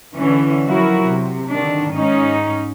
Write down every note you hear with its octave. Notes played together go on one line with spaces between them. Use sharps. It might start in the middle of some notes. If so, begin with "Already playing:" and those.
D3 E3 C#4
F3 F#3 E4 F#4 A#4
C3
D3 D#3 D4
G#2 C#4 D#4